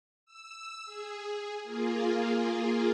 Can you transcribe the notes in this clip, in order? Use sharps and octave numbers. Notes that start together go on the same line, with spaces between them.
E6
G#4
A#3 F4 G#4